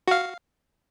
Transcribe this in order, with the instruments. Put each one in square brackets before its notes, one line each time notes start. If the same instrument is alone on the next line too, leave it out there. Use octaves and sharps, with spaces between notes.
[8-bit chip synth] F#4 F5